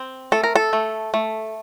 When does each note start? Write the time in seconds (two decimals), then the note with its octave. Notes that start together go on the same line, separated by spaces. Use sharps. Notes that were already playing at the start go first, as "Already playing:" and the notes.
Already playing: C4
0.32 A3 A4
0.44 A#4
0.56 A4
0.73 A3
1.14 A3